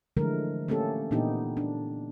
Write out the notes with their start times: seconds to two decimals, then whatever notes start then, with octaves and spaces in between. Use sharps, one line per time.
0.17 D3 E3 F3 G#3 A3 A#4
0.68 A3 A#3 C#4 G4 A4
1.11 A#2 E3 B3 D4 D#4 G4
1.57 D4